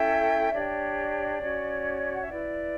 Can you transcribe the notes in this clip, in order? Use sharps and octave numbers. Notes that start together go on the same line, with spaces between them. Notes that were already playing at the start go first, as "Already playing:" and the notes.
Already playing: C#4 E4 A4 E5 G5
D4 G4 C#5 D5
C#4 F#4 C#5
F#5
E5
E4 B4 D5